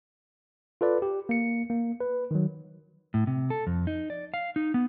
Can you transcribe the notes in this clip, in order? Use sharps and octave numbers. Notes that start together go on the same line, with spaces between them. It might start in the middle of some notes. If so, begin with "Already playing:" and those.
F4 A4 B4 D5
G4
A#3 C#7
A#3
B4
D#3 F#3
A2
C3
A4
F2
D#4
D5
F5
D#4
B3